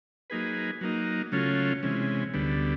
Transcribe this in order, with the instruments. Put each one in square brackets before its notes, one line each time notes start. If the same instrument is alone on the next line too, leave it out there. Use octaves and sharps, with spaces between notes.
[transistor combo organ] F#3 A#3 D#4 G#4 B4
F#3 A#3 D#4
C#3 F#3 A3 C#4 F4
C3 E3 G#3 C#4
D2 D3 G3 B3